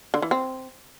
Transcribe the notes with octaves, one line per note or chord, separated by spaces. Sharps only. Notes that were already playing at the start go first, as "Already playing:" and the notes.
D3
E3
C4